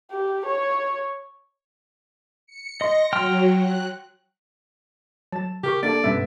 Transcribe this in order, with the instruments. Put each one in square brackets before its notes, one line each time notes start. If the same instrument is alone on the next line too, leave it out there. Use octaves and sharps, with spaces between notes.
[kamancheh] G4
C#5
[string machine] C#7
[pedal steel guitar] D#5 C6 [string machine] A#6
[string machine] F#3 [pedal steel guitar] G5 C6 F6
[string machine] F#6
[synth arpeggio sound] F#3 A6 [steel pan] A5
[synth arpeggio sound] C#3 A#4 C#6 [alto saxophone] G4
[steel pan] A#3 D4 A4 [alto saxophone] D5
[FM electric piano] G2 B2 G3 [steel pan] B3 E5 [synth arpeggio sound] C#4